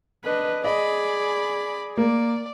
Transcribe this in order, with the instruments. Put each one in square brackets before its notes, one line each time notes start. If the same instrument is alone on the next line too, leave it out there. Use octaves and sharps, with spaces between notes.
[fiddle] D4 [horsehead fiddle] B4 D#5
[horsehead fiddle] G#4 [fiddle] D5 B5 [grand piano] D#5
[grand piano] A#3 [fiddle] D5